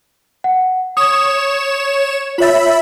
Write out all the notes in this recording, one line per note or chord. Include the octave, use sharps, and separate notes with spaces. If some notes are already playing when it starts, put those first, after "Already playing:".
F#5
C#5 D#6 E7
F4 C#5 E5 B5 A6